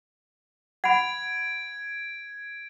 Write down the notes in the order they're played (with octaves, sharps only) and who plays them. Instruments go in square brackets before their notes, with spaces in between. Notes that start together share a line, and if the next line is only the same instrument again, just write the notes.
[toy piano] F#5 B5 [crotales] G#6 D7